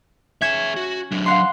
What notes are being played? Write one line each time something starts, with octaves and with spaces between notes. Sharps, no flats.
C#4 G#4 E5 G#6 E7
F#4
F#3 D4
F5 F#5 C6